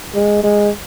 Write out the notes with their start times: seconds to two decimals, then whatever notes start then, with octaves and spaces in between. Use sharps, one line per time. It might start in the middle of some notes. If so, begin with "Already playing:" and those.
0.14 G#3
0.44 G#3